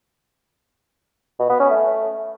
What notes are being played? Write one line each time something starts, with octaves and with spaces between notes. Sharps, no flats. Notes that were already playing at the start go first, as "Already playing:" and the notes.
B2
B3
C#4
A3